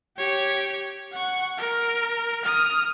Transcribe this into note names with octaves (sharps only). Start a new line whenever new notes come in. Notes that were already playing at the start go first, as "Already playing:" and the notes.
G4 C#5
F#5 C#6
A#4
D#6 F6